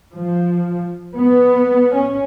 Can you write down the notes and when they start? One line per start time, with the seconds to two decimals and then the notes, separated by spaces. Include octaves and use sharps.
0.13 F3
1.17 B3
1.95 C#4